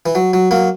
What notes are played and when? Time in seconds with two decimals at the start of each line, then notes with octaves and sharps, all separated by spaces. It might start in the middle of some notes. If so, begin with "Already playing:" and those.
0.06 E3
0.15 F#3
0.33 F#3
0.51 F#3 A#3